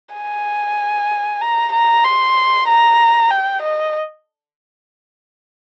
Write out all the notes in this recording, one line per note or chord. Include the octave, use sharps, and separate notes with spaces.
G#5
A#5
A#5
C6
A#5
G5
D#5